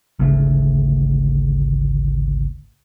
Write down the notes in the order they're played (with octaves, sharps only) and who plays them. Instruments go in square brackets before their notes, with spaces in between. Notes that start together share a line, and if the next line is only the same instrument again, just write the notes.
[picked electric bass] G#1 D2 C#3 A3